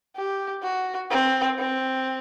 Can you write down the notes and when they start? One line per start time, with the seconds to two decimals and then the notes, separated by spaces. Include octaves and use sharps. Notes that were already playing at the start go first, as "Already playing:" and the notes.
0.17 G4
0.63 F#4
1.11 C4
1.58 C4